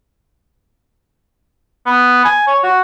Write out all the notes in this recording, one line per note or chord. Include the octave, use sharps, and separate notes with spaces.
B3
G#5
C#5
F#4